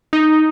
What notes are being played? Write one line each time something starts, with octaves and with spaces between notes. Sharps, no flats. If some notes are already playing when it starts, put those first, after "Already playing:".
D#4